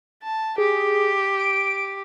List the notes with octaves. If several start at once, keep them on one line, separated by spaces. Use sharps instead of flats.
A5
G4 G#4
D7